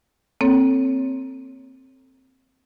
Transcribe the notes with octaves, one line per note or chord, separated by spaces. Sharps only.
A#3 C4 A4 C#5